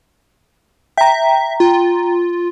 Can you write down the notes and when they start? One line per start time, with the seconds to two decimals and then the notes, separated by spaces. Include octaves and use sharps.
0.97 E5 G5 A#5
1.60 F4